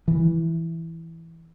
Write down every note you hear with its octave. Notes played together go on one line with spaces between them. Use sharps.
E3